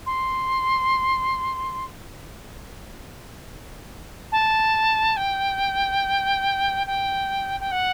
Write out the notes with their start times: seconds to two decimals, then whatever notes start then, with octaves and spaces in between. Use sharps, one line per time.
0.06 C6
4.32 A5
5.16 G5
6.87 G5
7.60 G5
7.71 F#5